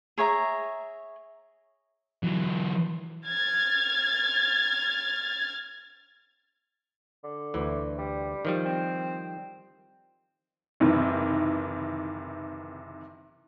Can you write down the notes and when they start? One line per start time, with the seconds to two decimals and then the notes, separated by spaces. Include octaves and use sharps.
0.18 G#4 C#5 E5 A#5
2.23 E3 F#3
3.25 F6 G#6 A6
7.24 D3
7.54 D2 E3
7.98 G3
8.45 D#3 F3 G3
8.65 C4
10.80 F#1 C3 D#3 E3